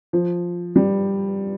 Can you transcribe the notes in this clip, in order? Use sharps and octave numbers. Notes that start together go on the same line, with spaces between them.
F3
G3